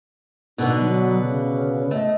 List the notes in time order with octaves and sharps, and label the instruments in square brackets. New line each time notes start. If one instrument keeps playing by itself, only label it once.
[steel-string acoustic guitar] B2 D3 B3 [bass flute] D#4
[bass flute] F#3
C#3
[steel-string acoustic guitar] A3 [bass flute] D#5